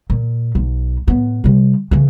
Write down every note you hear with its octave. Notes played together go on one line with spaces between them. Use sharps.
A#2
B1
A2 B3
C3 G3
C#3 E3